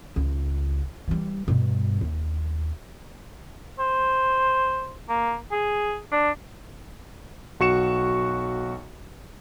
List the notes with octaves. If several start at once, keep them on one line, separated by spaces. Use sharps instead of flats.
C#2
E3 G3
G2 B2
D#2
C5
A#3
G#4
D4
B1 F#4 C#6 C#7 E7